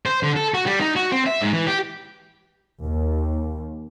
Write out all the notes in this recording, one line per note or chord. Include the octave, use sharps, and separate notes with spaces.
C5
D3
A4
F#4
G3
D#4
F#4
C4
E5
G#2
E3
G4
D#2